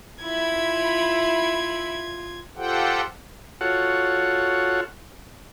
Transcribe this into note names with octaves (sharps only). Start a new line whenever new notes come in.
E4 F4 B5 G#6
F4 G4 A4 C5 F#5 G5
F4 F#4 A4 C#5 F#5